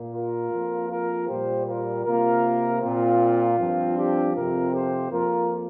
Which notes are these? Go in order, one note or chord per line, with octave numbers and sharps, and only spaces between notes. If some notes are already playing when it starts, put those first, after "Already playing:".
Already playing: A#2 A#3
F4 A#4
F2 F3 A#3
F4 A#4
A#2 G3 A#3 G4 C5
F4 A#4
C3 A#3 F4 A#4
A#2 A#3 C4 F4
G2 F3 C4
D4 G4
F2 C3 F3 C4 F4 A#4
G4 C5
F2 F3 A#3 F4 A#4